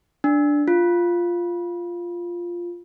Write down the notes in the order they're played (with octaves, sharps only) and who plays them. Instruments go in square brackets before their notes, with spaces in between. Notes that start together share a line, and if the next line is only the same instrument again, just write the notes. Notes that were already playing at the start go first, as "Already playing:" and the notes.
[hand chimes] D4
F4